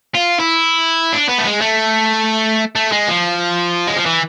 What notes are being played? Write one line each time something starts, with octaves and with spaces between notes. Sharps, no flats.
F4
E4
D4
B3
A3
G#3
A3
A3
G#3
F3
G#3
F3
E3